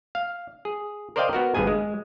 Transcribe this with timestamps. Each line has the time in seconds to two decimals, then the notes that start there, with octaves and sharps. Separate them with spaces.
0.15 F5
0.65 G#4
1.16 A#4 C5 D5 D#5 F5 G5
1.33 B3 F#4 A#4
1.55 G#1 G2 B3 G#4 G#5
1.67 G#3